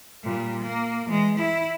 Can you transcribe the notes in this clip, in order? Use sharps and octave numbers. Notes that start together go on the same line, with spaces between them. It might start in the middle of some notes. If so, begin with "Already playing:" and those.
A#2 G3
A#3
E3 G#3
E4